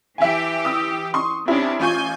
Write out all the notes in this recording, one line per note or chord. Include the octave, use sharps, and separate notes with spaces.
E3 G4 E5 G#5
D#6 E6
C6 C#6 D#6
C3 C#4 D4 E4
A1 F4 G#5 C#6 G6